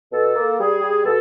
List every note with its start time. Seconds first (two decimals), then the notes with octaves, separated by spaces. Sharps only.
0.12 B2 A4
0.35 A#3
0.59 G3 G#4
0.82 G3
1.05 B2 A4